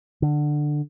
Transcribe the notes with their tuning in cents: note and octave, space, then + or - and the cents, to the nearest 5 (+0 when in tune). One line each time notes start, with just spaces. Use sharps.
D3 +15